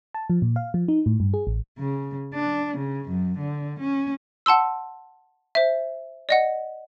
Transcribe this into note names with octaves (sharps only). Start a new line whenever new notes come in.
A5
F3
A#2
F5
F3
D#4
A2
G2
G#4
A1
C#3
D4
C#3
F#2
D3
C#4
F#5 A5 C6 E6
C5 E5
D5 D#5 F#5